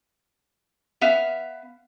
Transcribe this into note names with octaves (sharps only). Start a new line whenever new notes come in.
B3 E5 F5